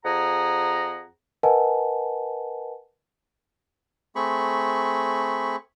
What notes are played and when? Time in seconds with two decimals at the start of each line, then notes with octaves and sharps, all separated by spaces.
0.05 F2 G#4 F#5 A#5
1.43 A#4 B4 D#5 F#5 G#5 A5
4.16 A3 C4 G#4 B5 C#6